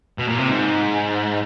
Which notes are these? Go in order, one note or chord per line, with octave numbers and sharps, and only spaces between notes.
B2
A#2
C3
G#2